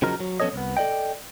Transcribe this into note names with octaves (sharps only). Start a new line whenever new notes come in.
C#3 F3 F#3 D#4 A#4
F#3
F3 B3 C#4 A4 C#5 D#5
C2 B3
A4 D5 D#5 G5